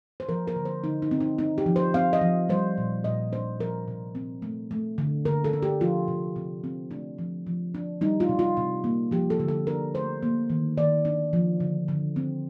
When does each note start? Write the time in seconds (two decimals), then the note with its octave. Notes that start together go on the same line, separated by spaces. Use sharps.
0.20 C5
0.29 F3 A#4
0.47 A#4
0.56 D3
0.65 C5
0.84 D3 D#4
1.02 D#4
1.11 C4
1.20 D#4
1.38 C4 D#4
1.58 G4
1.66 F3
1.76 C5
1.94 C4 F5
2.13 D#5
2.21 F3
2.49 G3 C5
2.78 A#2
3.04 A#2 D#5
3.33 D4 C5
3.60 F3 A#4
3.88 C3
4.15 C4
4.42 A3
4.71 A3
4.98 D3
5.25 D3 A#4
5.44 A4
5.53 D4
5.62 G4
5.81 F3 F4
6.08 C3
6.36 C3
6.64 C4
6.91 A3 D4
7.19 F3
7.47 F3
7.75 D4
8.01 G3 D#4
8.20 F4
8.29 C3
8.39 F4
8.57 C3
8.84 A#3
9.11 F3 G4
9.30 A4
9.40 D3
9.48 A4
9.67 D4 A#4
9.94 A3 C5
10.23 A#3
10.50 D#3
10.77 D#3 D5
11.05 D4
11.33 F3
11.60 D3
11.88 D3
12.16 C4